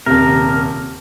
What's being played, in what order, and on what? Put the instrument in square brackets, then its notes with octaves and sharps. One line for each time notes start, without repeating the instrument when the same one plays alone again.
[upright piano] D#1 C3 [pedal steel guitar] A#4